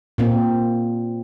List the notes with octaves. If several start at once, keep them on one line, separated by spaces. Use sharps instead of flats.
A#2 A#3 C4